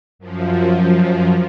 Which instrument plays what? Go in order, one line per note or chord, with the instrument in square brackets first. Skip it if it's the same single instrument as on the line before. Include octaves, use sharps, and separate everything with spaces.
[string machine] F#2 F3